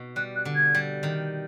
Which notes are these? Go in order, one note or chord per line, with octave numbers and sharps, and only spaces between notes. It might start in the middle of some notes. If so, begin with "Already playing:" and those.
Already playing: B2 D#4
G3 F#6
F#6
D3
G#6
G3
D#3